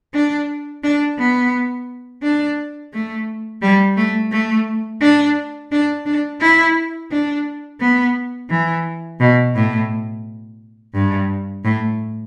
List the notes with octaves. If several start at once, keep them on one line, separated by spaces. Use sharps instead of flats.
D4
D4
B3
D4
A3
G3
A3
A3
D4
D4
D4
E4
D4
B3
E3
B2
A2
G2
A2